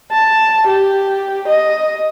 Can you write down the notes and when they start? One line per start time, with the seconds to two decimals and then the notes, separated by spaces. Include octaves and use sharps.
0.11 A5
0.67 G4
1.48 D#5